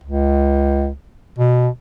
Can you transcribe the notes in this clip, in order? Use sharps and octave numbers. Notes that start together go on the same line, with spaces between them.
C#2
B2